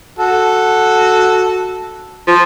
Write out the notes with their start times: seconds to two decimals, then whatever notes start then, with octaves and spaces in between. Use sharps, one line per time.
0.19 F#4 A4
2.27 F3